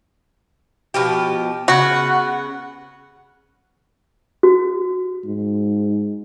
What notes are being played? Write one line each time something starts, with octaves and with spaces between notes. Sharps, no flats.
B2 F3 G4
C#3 B3 F#4
F#4
G#2